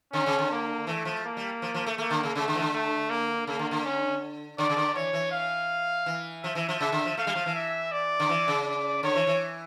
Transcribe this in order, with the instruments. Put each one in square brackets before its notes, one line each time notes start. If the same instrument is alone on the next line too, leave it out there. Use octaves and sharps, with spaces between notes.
[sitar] D3 [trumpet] C#4
[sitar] C#3
D3
[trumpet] A#3
[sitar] E3 [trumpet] A3
[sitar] F3
[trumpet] A#3
[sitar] G3
F3
F3
A3
[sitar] A3 [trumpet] A#3
[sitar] D3
C#3
[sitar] C#3 [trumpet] A3
[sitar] D3
E3
D3
[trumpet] A3
A#3
[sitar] C#3 [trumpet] A#3
[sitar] D3
D3
[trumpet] C#4
[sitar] D3 [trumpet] D5
[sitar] C#3
D3
[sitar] E3 [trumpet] C#5
[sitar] E3
[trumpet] F5
[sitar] E3
[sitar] F3 [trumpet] E5
[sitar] E3
F3
[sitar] C#3 [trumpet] E5
[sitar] D3
F3
[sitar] A3 [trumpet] F5
[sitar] G3
F3
E3
[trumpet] E5
D5
[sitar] D3
E3
C#3
[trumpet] D5
[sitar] D3 [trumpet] C#5
[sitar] E3
E3